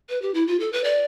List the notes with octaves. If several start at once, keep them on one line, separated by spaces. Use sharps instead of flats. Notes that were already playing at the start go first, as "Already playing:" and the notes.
B4
G4
E4
F4
A4
B4
D5